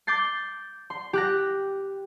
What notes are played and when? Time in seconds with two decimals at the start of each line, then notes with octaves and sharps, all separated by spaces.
0.07 D6 G6 A6 C7
0.90 C6
1.13 G4 F#6 A#6